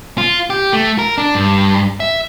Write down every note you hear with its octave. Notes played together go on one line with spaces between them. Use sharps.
F4
G4
A3
A#4
D4
G2
E5